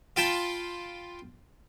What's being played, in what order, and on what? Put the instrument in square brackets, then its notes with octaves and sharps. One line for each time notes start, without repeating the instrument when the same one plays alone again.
[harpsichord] F4 G5 A5 B5